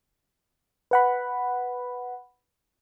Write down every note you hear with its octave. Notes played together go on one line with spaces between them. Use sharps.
B4 F#5 B5